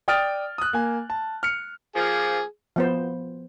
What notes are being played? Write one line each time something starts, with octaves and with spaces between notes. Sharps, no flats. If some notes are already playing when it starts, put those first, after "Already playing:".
D5 G5 D#6 F6 A6 D7
D#6 F#6
A#3 G#5
A5
F6 C#7
F3 A#3 G#4
F3 B3 C5